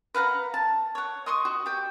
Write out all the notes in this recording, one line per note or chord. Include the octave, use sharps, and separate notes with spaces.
B4 F5 F#5 A#5
A5
C#5 F#5
D#5 C6 C#6 D#6
F#4
G4 G5